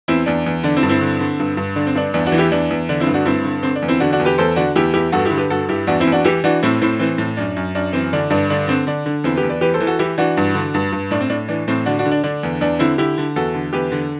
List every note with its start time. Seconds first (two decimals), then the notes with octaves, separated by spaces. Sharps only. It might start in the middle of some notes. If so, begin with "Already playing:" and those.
0.08 E2 C4 E4
0.26 E2 D4
0.46 E2
0.64 D3 D4
0.76 C4 E4
0.83 G2
0.89 C4 E4
1.01 D3
1.20 D3
1.40 G2
1.57 G2
1.76 D3 D4
1.86 C4
1.95 G2 D4
2.14 E2 D4
2.26 D4 F#4
2.32 E3
2.38 E4 G4
2.52 E2 D4
2.70 E2
2.89 D3 D4
3.00 C4 E4
3.07 G2
3.14 D4 F#4
3.25 G2 C4 E4
3.45 D3
3.63 D3 C4
3.76 D4
3.82 E2
3.88 C4 E4
4.00 D3 D4 F#4
4.13 D4 F#4
4.19 E2
4.25 G4 B4
4.38 E2 A4 C5
4.56 D3 D4 F#4
4.76 E2 E4 G4
4.94 E2 E4 G4
5.12 G2 F#4 A4
5.25 E4 G4
5.31 D3
5.38 G4 B4
5.50 G2 F#4 A4
5.69 G2 E4 G4
5.87 E2 D4 F#4
6.00 C4 E4
6.07 E2
6.12 D4 F#4
6.25 E3 E4 G4
6.44 E3 D4 F#4
6.63 A2 C4 E4
6.81 A2 C4 E4
6.99 E3 C4
7.18 A2
7.37 F#2 D4
7.56 F#2
7.75 F#2 D4
7.93 E3 C4
8.13 D3 D4
8.30 G2 D4
8.50 D3 D4
8.68 D3 C4
8.87 D3 D4
9.06 D3
9.24 E2 C4 E4
9.36 G4 B4
9.43 E2
9.49 B4 D5
9.61 E3 G4 B4
9.74 A4 C5
9.80 E3
9.87 F#4 A4
9.99 E3 E4 G4
10.18 E3 D4 F#4
10.37 G2
10.55 D3
10.74 G2
10.92 G2
11.11 A2 D4
11.21 C4
11.30 A2 D4
11.48 E3 D4
11.68 A2 C4
11.86 D3 D4 F#4
11.99 D4 F#4
12.06 D3
12.11 D4
12.24 D3 D4
12.43 E2
12.61 E2 D4
12.79 D3 C4 E4
12.98 D3 E4 G4
13.18 D3
13.36 E2 F#4 A4
13.54 D3
13.73 E2 G4 B4
13.92 D3